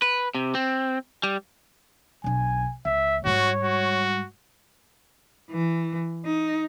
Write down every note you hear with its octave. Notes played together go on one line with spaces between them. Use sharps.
B4
C3
C4
G3
B1 D4 G#5
C#2 E5
G#2 G3 F#4 C#5
F#4
E3
D#4